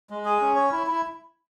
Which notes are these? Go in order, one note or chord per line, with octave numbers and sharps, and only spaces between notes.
G#3
G#4
C#4
C#5
E4
E4